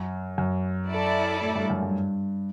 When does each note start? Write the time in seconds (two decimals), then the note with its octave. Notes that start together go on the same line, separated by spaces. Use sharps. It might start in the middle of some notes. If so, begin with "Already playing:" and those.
Already playing: F#2
0.38 F#2
0.90 E4 A4 D5
1.41 A2
1.56 G2
1.70 F#2
1.83 G2